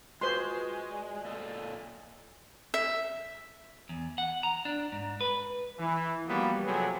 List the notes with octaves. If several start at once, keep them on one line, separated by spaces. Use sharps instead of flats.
G#3 F4 F#4 B4 C5 C6 C#6 D#6
D5
A#2 A4 D#5
E5
E2
F#5
A#5
D4
G#2
B4
E3
F3 G3 A#3 B3 F#4
C3 F3 F#3 G#4 A4 B4